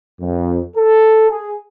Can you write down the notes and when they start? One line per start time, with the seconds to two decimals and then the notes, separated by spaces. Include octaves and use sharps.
0.21 F2
0.76 A4
1.30 G#4